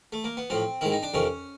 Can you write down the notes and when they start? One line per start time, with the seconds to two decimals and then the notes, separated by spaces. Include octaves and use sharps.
0.12 A3
0.24 A#3
0.37 B3
0.50 A2 F3 C4
0.81 G#2 D#3 E4
0.92 D#4
1.03 D4
1.14 F2 C3 D#3 C#4